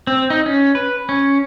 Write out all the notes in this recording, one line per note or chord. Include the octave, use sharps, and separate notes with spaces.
C4
D#4
C#4
B4
C#4